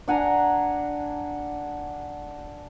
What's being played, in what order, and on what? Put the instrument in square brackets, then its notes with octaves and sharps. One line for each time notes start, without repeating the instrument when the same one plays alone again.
[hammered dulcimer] D4 F#5 G#5 A#5